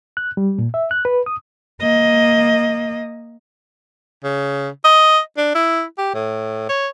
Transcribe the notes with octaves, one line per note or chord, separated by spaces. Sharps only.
F#6
G3
A#2
E5
F#6
B4
D#6
A#3 D#5
C#3
D#5
D4
E4
G4
A2
C#5